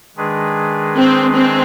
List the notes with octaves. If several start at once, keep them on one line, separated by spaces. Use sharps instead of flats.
D#3 G#3 D4 G#4 B4
C4
C4